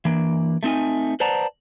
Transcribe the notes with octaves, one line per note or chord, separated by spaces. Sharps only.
E3 A#3 D4
A3 C4 D#4 G#5
B4 C5 D5 F#5 A5 A#5